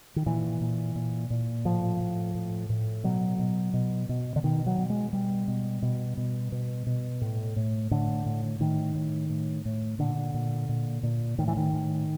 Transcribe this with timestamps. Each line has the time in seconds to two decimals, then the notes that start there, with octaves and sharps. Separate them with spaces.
0.16 D#3
0.26 A#2 E3
0.61 A#2
0.96 A#2
1.30 A#2
1.65 A2 F3
2.00 A2
2.35 A2
2.69 A2
3.04 B2 F#3
3.39 B2
3.74 B2
4.09 B2
4.36 D3
4.43 B2 D#3
4.66 F#3
4.78 B2
4.90 G#3
5.13 B2 G3
5.48 B2
5.82 B2
6.17 B2
6.52 B2
6.87 B2
7.21 A2
7.56 A2
7.91 A2 D3
8.26 A2
8.60 A2 D#3
8.95 A2
9.30 A2
9.65 A2
9.99 A#2 D3
10.34 A#2
10.69 A#2
11.03 A#2
11.38 A2 D#3
11.48 E3
11.57 D#3
11.73 A2